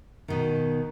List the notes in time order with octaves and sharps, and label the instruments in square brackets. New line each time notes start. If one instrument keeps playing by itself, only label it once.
[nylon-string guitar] B2 D#3